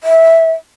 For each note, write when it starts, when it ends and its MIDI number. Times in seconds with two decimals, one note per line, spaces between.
0.03 0.52 76